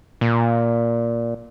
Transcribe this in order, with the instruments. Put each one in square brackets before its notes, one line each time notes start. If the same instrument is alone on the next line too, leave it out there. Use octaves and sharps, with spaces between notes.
[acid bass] A#2